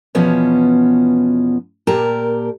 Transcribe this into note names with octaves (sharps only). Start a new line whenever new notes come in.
E2 B2 F3 B3 C#4
A#2 G4 A#4 A5 A#5